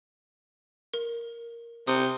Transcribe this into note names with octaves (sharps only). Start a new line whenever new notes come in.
A#4
C3 D#6